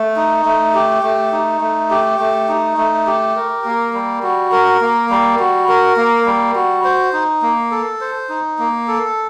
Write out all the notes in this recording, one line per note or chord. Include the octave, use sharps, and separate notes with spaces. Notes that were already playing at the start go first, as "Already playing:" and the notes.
Already playing: A3
D#4
A3
G4
A3
D#4
A3
G4
A3
D#4
A3
G4
A#4
A#3
G3
F#4
A#4
A#3
G3
F#4
A#4
A#3
G3
F#4
C5
D#4
A#3
A4
C5
D#4
A#3
A4